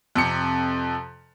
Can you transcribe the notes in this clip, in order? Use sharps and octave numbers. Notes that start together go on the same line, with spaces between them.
F2 C3 C#7